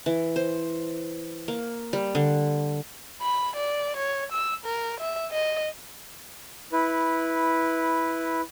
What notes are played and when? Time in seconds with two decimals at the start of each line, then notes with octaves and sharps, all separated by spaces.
0.06 E3
0.36 C5
1.48 A#3
1.93 G3
2.15 D3
3.22 B5
3.56 D5
3.97 C#5
4.32 E6
4.65 A#4
5.00 E5
5.31 D#5
6.72 E4 B4